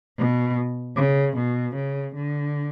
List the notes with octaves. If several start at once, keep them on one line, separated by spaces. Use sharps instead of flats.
B2
C#3
B2
C#3
D3